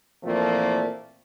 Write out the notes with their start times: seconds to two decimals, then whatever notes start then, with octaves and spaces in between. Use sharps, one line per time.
0.24 A#2 E3 F3 A3 A#3 C4